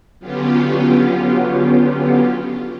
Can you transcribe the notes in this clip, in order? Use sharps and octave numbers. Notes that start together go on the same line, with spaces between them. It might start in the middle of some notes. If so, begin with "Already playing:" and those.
D3 F#3 B3 C#4 F4 G4